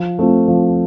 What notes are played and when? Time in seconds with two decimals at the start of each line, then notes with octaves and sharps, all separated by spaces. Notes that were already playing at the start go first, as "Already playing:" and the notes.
Already playing: F3
0.19 A3 C4 F4
0.48 F3